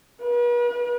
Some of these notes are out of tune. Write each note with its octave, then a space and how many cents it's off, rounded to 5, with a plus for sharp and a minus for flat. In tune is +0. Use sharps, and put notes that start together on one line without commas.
B4 -45